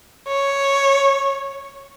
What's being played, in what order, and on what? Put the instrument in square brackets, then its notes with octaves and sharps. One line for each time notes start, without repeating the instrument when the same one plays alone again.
[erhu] C#5